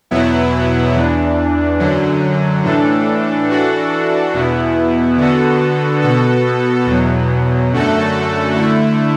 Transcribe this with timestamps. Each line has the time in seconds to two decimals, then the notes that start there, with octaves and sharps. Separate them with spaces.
0.11 E2 B2 F#3 B3 E4
0.94 E2 E3 D4
1.80 F#2 D3 F#3
2.64 A2 E3 D4 A4
3.48 E3 D4 F#4 A4
4.34 E2 B2 B3 E4
5.18 D3 B3 F#4 A4
6.02 B2 B3 F#4 A4
6.86 E2 B2 F#3
7.72 F#2 D3 A3 F#4 A4
8.56 D3 A3 E4